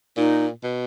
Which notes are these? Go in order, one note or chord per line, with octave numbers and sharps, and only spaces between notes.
A#2 D#4
B2